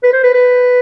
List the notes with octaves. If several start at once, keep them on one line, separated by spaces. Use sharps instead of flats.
B4
C5
B4
B4